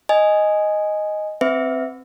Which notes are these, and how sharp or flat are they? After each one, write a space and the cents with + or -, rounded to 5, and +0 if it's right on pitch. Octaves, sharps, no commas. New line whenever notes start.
D#5 +0 G#5 +0
C4 +0 B4 +35 E5 +0